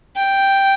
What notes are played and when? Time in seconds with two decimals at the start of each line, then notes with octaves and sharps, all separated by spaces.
0.16 G5